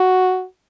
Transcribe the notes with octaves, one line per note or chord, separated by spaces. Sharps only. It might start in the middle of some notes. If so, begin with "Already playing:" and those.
Already playing: F#4